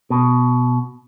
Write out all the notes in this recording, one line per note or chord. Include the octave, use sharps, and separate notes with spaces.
B2